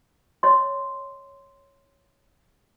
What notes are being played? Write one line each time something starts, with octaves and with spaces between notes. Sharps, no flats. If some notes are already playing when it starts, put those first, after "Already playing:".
C#5 D#5 C6